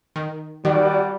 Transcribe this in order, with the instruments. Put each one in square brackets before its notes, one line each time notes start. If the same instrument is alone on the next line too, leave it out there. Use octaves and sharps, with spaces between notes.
[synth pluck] D#3
[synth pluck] D#3 [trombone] G3 [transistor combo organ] F#4 D5